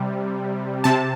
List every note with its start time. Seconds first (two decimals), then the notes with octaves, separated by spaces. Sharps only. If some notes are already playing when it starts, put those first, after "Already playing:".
Already playing: C3 G3
0.84 C3 A5